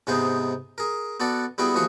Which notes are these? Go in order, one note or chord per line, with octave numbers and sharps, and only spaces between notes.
G#2 C3 G#3 B3 D#4 G#4
G#4 A#4
B3 F#4 A4 D5 F#5
G3 B3 E4 F#4 G#4 G5
D#2 E3 F3 F#4 G#4 C#6